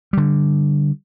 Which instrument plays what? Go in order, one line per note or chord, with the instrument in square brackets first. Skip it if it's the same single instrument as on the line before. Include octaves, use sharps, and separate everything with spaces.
[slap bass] D3 G3